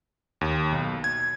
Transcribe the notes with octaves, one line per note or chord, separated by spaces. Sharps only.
D#2
B1
G#6